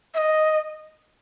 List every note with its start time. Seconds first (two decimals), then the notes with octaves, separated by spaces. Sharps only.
0.14 E5
0.18 D#5